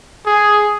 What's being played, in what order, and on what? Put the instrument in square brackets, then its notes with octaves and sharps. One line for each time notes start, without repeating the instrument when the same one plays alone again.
[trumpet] G#4